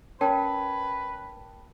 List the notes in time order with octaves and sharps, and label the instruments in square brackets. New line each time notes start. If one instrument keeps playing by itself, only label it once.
[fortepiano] C#4 [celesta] A#4 G5 A5 [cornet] B4